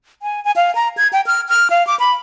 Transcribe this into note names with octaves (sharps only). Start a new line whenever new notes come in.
G#5
G#5
F5
A#5
G#6
G5
F6
F6
F5
D6
B5